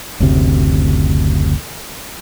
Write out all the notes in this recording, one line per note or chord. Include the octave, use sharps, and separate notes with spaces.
F#1 D2 C3